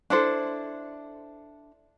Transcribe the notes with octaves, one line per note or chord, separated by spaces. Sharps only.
D4 E4 A4 C5